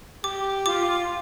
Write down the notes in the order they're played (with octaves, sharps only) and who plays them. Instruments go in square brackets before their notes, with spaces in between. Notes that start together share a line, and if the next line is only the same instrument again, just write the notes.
[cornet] G4 [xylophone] D6
[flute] F4 [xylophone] D6